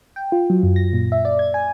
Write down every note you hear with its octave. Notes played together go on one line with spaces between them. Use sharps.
G5
F4
F#3
F#2
A#6
A#2
E5
D5
G#6
G#5